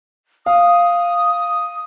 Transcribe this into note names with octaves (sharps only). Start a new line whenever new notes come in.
F5 D#6